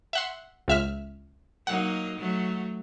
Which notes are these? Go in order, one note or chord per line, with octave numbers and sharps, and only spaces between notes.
E5 F#5 C6
C#2 E5 F6
F#3 A#3 D#4 F#5
F#3 A3